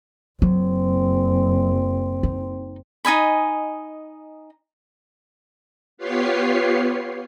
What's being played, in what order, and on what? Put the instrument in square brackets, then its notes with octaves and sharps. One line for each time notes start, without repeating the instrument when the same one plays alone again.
[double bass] F#1 C4 [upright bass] F#3
[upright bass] D#4
[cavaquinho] D#4 D#5 G#5 B5
[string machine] B3 F4 G4 B4 C#5 C7